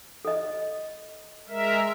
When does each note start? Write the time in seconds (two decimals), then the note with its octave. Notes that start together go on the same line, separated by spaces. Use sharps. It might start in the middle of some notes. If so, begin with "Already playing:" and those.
0.25 A4 D#5
1.49 G#3 A#4 E5